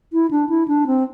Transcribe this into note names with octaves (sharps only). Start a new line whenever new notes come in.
E4
D4
E4
D4
C4